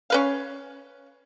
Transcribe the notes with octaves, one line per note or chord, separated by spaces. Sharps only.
C#4 B4 F5